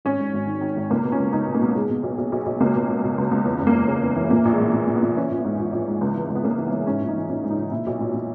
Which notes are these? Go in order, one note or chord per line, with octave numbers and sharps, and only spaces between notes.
G#1 C#4
G#2
G#1
D#3
D#3
G#1
C#2 A#3
B2
C#4
C#2
C#2 D#4
B2
A#3
B2
B2 G#3
B2
B1
B1
B1
B1
C#2 A#3
B2
B2
B2
C#2
C#2
E2
F#1
A#3
E2
C#3
E2
E3
A#2 A#3
A#1
G#3
A#2
A#2 G#3
A#2
B3
A#2
E3 C#4
A#1
B3
G#2
A#1
A#1
G#2
C#2
E3
C#2
B3
C#3 A#3
E3
B3
E3
G#2 C#4
A#1
D#4
E3
A#1 C#4
G#2
D#4
A#1
A#2 E4
B1
A#2
A#2